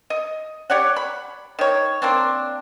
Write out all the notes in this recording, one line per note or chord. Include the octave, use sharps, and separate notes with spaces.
D#5
G4 C#5 D5 F#5
B5
D#3 C#5
A#3 C4 D4